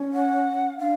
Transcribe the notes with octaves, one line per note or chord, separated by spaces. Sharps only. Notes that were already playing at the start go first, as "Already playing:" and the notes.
Already playing: C#4
F#5
D4 F5